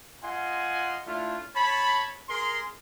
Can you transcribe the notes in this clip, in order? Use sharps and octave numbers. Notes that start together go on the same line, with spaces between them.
F4 D#5 F#5 G#5 C6
A3 D4 E4 F4
C#5 A5 B5
G#4 A#4 C6